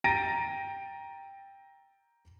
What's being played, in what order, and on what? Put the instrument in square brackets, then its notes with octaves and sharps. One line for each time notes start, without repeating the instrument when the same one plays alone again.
[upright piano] G5 A#5 A6 A#6 D7 D#7